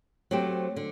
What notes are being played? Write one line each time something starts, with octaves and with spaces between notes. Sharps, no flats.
F#3 A3 C4 G4 C5
D3